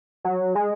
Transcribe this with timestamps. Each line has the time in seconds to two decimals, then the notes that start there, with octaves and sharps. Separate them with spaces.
0.25 F#3
0.55 G#3